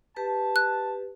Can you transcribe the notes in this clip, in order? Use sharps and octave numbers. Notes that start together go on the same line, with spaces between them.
G4 B4 A5
F#6